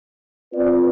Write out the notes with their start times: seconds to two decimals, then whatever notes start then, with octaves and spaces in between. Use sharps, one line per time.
0.53 C4 F4 B4 D5